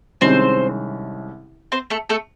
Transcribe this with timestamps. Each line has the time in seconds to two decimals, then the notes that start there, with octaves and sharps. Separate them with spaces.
0.21 C2 C3 D#3 G#3 C4 C#4 C5
1.72 C4 C5
1.90 A3 A4
2.09 A3 A4